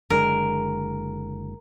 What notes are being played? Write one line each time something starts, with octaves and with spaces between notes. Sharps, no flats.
F#1 D3 G#3 A#4